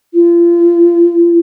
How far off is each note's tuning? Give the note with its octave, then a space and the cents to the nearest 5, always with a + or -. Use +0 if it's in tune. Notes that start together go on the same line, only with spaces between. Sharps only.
F4 -35